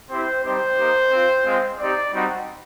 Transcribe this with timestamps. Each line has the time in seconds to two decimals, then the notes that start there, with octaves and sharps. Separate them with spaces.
0.10 C4 E4 G4 C5
0.44 G3 C4 D#4 G4 C5
0.78 A#3 D#4 G4
1.12 C4 F4
1.45 G#3 C4 F4
1.79 C4 D#4 G4 D5
2.13 G3 C4 D#4 F#4